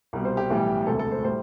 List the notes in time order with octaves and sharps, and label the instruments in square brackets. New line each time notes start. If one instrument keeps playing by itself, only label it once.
[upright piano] C2 B2 G3
C5
G4
B1 A2 E3 G3
E1 D2 C3 A4
A4
C5
A2 G3 C5